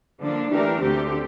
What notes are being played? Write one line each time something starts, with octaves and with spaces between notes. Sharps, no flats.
D3 F3 A#3 D4
E3 A3 D4 G4 A#4
D2 D3 A3 C4 G4